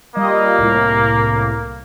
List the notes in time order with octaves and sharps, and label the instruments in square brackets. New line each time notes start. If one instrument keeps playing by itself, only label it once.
[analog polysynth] G3 F4 D#5 [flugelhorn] A#3
[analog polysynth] C2 A2